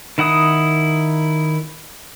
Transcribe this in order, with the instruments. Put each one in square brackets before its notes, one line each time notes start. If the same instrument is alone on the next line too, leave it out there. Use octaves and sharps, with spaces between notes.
[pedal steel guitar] D#3 E4 F#5 D#6